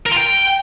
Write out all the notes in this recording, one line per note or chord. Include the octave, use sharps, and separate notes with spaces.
A#4
F4
G5